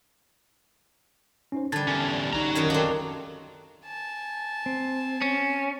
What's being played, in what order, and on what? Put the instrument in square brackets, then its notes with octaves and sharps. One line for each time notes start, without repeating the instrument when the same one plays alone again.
[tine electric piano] C#4 D#4 C5
[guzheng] D3 G3 [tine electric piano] A5 G#6 A6
[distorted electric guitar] E2 C#4
[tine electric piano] B1 D#4 [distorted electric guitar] F#4 A#5
[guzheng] F#2 D#3 C#5
[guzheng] C4 D4 [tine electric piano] A4 A#4 F5
[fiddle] G#5 A5
[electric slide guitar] C4
[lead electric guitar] C#4